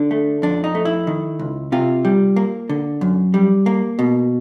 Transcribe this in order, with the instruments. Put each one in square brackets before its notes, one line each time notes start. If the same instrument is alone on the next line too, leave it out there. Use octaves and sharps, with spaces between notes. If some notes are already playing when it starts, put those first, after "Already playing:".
Already playing: [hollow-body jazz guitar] D3 D4
A3
F2 D4
D#4
A3
E4
D#3
C#2
C3 F4
G3
A#3
D3
F#2
G3
A#3
B2